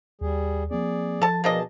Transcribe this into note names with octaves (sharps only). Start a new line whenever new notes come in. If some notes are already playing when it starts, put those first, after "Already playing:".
D#2 G3 G#4
F3 A#3 C4 G#4 D5
F3 A4 A5
B2 A#3 D4 G#4 D#5 A5